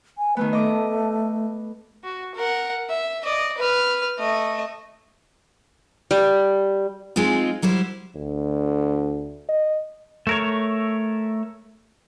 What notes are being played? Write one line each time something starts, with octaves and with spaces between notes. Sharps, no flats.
G#5
D#3 A3 B3 B4
A3 D#5 D6
F#4
A#4 F#5
E5
D5 D#5
B4 F6
A3 D#5
G3
G#3 C4 D#4 F4
F#3 G3 E4 C5
D2
D#5
A3 A#4 C#5